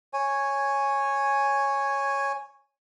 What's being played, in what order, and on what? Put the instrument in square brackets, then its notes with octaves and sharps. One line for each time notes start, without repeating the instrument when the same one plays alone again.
[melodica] C#5 G#5